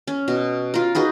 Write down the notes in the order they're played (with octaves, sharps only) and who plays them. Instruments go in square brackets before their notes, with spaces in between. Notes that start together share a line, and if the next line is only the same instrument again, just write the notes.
[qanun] C#4
B2
F4 A#4
D#4 F#4 G#4 B4